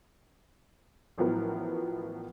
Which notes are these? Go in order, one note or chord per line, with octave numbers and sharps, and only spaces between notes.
A1 A2 F3 F#3 B3 A#4